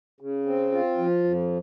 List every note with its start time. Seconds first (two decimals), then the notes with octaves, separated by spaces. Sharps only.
0.21 C#3
0.46 C4
0.72 F4
0.98 F3
1.24 F2